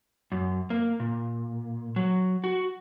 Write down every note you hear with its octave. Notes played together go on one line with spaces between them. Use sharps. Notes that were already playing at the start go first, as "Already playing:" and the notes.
F#2
A#3
A#2
F#3
F#4